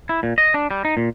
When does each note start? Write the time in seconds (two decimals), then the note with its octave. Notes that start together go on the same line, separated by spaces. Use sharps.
0.09 E4
0.23 A#2
0.38 D#5
0.54 D4
0.71 G3
0.85 D#4
0.97 A#2